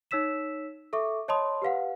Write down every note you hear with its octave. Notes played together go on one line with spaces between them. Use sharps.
D#4 C#5 E6 B6 E7
A4 E5 C#6 D6
C#5 D#5 A5 B5 C6 D#6
G4 B4 F5 F#5